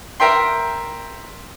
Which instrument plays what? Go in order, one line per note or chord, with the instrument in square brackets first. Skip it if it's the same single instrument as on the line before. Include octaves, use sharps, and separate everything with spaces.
[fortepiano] A#4 E5 G5 C6